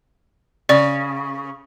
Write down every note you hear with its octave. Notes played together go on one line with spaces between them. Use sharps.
C#3 D5